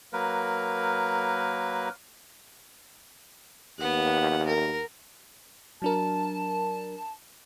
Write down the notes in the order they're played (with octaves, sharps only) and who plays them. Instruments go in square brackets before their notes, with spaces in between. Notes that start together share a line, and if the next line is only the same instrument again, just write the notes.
[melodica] F#3 A#3 A#4 B4
[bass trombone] D#2 [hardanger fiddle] B3 F#5
[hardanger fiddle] A#4
[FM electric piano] F#3 D4 A#4 [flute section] A5